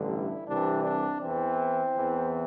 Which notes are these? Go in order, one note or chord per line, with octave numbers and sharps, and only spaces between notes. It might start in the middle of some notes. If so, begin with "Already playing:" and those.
Already playing: A1 G2 D3
E4
C2 C3 E3 D4
D4
E2 E3 C4
E2 E3